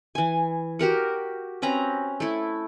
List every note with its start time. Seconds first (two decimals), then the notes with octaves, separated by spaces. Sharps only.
0.15 E3 G#5
0.79 F#4 G4 A#4 F#5
1.62 C4 C#4 B4 A#5
2.20 A3 E4